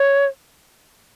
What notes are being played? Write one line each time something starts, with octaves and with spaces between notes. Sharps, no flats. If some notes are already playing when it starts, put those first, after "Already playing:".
Already playing: C#5